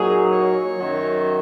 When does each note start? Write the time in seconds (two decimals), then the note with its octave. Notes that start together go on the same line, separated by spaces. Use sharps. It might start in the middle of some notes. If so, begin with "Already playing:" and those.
Already playing: A#2 F#3 A#3 D#4 G#4
0.33 C#5
0.78 F#2 D#3 F#3